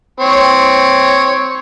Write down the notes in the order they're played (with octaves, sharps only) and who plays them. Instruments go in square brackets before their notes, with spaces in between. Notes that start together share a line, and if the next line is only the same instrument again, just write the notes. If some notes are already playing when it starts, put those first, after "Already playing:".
[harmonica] C4 C#5